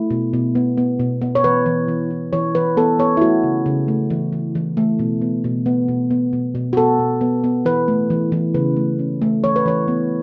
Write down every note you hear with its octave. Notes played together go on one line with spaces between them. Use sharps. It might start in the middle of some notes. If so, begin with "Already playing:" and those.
Already playing: A3 E4
B2
B2
B3
B3
B2
B3
C#5
E3 B4
E3
E3
E3
E3 C#5
E3 B4
B3 A4
B3 C#5
E4
A3 F#4
C#3
C#3
A3
E3
E3
E3
A3
B2
B3
B2
B3
B2
B3
B2
B2
F#4
B3 A4
B2
B3
B3
E3 B4
A3
E3
E3
C#3 B4
A3
C#4
A3
E3 C#5
B4
E3 C#5
B3